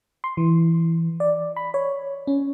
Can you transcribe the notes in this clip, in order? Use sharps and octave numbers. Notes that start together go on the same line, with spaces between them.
C6
E3
D5
B5
C#5
C#4